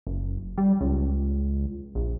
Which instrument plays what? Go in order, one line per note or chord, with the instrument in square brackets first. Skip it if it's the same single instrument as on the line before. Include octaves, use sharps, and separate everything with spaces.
[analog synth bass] F#1
G3
C#2
A#1